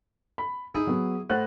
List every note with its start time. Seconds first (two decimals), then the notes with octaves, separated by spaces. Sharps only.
0.38 B5
0.75 D#4 E4 G#4
0.87 F#3 B3
1.30 A2 C5 F#5 F#6